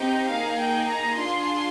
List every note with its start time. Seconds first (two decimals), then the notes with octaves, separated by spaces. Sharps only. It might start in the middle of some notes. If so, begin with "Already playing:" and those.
Already playing: C4 D#4 G4 G5
0.29 A#3 D#4 G#4 F5
0.60 G5
0.88 A#5
1.17 D4 F4 G#4 C6